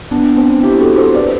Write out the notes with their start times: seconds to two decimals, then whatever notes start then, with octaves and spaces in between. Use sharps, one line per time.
0.11 B3 D4
0.38 C4
0.63 E4 G4
0.80 F#4 A4
0.97 A4 C5
1.15 B4 D5